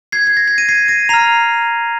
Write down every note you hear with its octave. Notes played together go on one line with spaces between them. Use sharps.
G#6 C7
G#6
A#6
G#6 C7
A#6 D#7
G#6 C7
A#6 D#7
A#5 F6 C7 F7